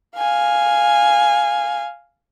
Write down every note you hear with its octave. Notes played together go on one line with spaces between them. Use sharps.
F5 G#5